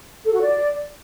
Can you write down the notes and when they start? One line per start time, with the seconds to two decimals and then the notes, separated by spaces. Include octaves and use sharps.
0.25 A4
0.33 F#4
0.41 D5